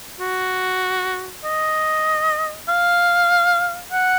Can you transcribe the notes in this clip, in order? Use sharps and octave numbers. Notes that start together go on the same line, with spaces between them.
F#4
D#5
F5
F#5